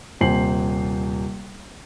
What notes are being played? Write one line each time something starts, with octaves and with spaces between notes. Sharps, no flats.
D#1 C3 C5 G#5 C7 F#7